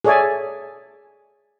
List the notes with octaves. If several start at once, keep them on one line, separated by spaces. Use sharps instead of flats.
G#4 A4 C#5 D5 E5 G#5